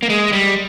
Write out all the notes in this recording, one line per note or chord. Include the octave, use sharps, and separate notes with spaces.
A#3
G#3
G3